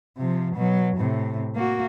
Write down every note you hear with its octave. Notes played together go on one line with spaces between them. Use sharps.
C3 F3
B2 F#3
A2 C3
A#3 F#4